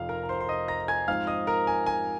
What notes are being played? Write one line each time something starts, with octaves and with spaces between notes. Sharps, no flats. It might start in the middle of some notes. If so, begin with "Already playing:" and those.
Already playing: F1 F2 F3 C4 D#4 F5
A#4 A#5
A#5
C5 C6
C6
D#5 D#6
A#5 A#6
G#5 G#6
G#2 F3 C4 D#4 F5 F6
D#5 D#6
A#4 A#5
G#5
G#5